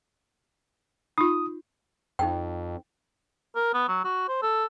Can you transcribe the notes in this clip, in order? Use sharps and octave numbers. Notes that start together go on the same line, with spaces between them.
D#4 F4 D#6
F2 D#4 G5
A#4
B3
F#3
F#4
C5
A4